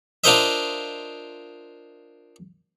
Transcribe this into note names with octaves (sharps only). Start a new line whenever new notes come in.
D4 F4 A#4 C5 D#5 E5